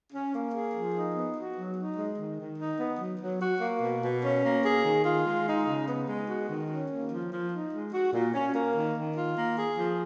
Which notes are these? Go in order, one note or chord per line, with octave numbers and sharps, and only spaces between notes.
C#4
A#3
G#4
F3
D#4
B3
F#4
F#3
D#4
G#3
D#3
D#3
D#4
B3
F#3
F#3
F#4
A#3
B2
B2
C#4
A#3
G#4
D#3
F4
G#3
D#4
C#3
B3
G#3
F#4
D#3
C#4
A#3
F3
F3
D#4
G#3
F#4
A#2
C#4
A#3
D#3
D#3
F4
A#3
G#4
F3